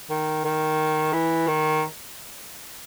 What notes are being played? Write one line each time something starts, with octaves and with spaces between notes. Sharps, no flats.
D#3
D#3
E3
D#3